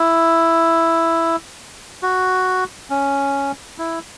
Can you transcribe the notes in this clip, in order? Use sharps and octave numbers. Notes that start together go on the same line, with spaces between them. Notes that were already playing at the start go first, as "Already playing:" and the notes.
Already playing: E4
F#4
C#4
E4